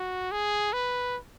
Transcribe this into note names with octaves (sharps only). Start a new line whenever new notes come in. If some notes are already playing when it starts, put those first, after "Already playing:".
Already playing: F#4
G#4
B4